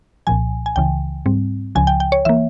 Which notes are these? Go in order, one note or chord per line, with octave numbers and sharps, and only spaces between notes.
C2 A#2 F3 G#5
G#5
C#2 C#3 E3 G5
G#2 G3 C4
C#2 C#3 F3 G#5
G5
G5
C#5
E3 A#3 E5